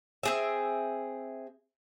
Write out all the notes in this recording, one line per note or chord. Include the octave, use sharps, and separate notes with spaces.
C4 G#4 E5